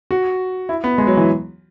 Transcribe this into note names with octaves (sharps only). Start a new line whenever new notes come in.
F#4
E4
B3
G#3
F#3
E3